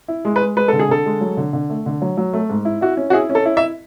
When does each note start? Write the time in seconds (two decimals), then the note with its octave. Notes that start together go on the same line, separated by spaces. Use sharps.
0.08 E4
0.25 G#3
0.36 B4
0.42 G#3
0.57 G#3 B4
0.68 D3 A4
0.79 G#4
0.89 D3 A4
1.06 G#3
1.21 F#3
1.37 D3
1.53 D3
1.70 A3
1.86 D3
2.02 F#3
2.17 F#3
2.33 A3
2.50 G#2
2.65 E4
2.81 E4 F#4
2.97 C#4
3.10 F#4
3.13 E4 G#4
3.29 C#4
3.35 A4
3.45 E4
3.57 E5